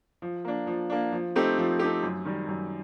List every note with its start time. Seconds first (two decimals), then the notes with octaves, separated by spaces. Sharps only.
0.22 F3
0.45 A#3 D4
0.67 F3
0.90 A#3 D4
1.12 F3
1.36 A3 C4 D#4 G4
1.58 F3
1.79 A3 C4 D#4 G4
2.03 F#2
2.25 D#3 G3
2.48 F#2